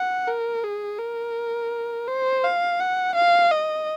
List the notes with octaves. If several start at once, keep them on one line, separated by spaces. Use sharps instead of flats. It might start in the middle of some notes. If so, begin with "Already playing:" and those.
Already playing: F#5
A#4
G#4
A#4
C5
F5
F#5
F5
D#5